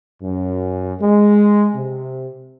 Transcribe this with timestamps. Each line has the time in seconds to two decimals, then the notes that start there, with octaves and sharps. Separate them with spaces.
0.22 F#2
1.00 G#3
1.75 C3